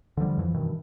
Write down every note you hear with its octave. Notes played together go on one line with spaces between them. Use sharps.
D3 E3 F3 G3
F2 E3 F3
G2 B2 D#3 E3